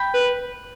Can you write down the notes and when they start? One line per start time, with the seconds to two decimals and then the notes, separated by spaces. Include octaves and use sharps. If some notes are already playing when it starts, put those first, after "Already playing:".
Already playing: G5 B5
0.14 B4